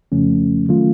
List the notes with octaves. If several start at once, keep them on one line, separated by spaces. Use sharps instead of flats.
F2 C#3 F3 A3 C#4
D#3 F#3 A3 C#4 F4